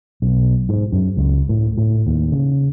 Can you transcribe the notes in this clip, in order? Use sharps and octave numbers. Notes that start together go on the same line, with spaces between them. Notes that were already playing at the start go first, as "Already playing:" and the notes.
B1
G#2
F#2
C#2
A2
A2
D#2
C#3